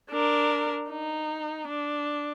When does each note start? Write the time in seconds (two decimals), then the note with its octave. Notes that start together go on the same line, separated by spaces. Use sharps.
0.11 D4 A#4
0.90 D#4
1.68 D4